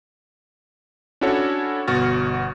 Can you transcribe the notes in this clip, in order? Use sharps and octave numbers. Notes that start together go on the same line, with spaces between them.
C#4 D4 E4 F#4 A4 C#5
G1 B2 F#4 C#6 F6 A6